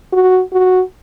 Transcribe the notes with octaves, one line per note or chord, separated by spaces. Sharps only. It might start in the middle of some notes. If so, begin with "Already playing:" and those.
F#4
F#4